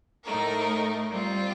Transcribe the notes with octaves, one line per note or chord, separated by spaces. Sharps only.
A2 A3 D#4 A#4
G3 C4 F4